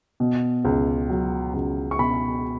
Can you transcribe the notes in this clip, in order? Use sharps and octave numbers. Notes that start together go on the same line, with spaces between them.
B2
C#2
F#3
C#2
C#6
B2 B5